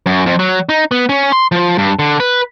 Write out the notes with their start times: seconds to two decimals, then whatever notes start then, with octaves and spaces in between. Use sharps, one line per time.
0.06 F#2
0.26 F2
0.39 F#3
0.69 D#4
0.92 B3
1.09 C#4
1.32 C6
1.52 F3
1.78 G2
1.99 D3
2.20 B4